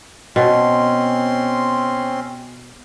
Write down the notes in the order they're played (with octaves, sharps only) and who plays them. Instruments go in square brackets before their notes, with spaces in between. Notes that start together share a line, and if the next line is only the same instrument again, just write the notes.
[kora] B2 [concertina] C4 C#4 C6